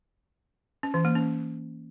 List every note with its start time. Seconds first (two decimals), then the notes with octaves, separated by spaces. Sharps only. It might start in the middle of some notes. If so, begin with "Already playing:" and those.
0.83 C#4
0.94 E3
1.05 A#3
1.15 C#4